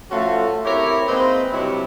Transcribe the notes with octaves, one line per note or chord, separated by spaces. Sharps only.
F3 A3 C#4 F4 F#4 A4
C4 E4 G4 A#4 C#5
G#3 A#3 C4 D#4 B4 C5
G2 C3 F#3 E4